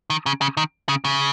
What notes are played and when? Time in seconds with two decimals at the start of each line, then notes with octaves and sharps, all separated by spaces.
0.10 D#3
0.26 C#3
0.41 C#3
0.57 D#3
0.89 C#3
1.05 C#3